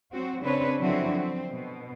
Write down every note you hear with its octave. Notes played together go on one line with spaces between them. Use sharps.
F#3 C4 F#4
C#3 C4 D4 B4 C#5
D3 F3 F#3 C4 E4 F#4
C4
B2